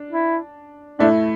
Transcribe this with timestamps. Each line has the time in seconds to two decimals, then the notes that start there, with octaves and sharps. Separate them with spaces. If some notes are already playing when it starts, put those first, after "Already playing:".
Already playing: D4
0.11 E4
0.99 A2 A3 D4 E4